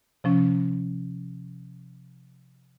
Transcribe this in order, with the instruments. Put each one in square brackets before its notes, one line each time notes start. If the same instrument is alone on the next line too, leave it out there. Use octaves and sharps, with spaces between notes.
[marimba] C3 F3 C#4